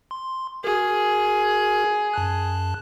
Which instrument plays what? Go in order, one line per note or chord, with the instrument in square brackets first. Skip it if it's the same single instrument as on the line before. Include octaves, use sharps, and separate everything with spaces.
[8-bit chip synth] C6
[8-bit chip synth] F#4 A#4 [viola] G#4
[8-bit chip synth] F#2 A5 F#6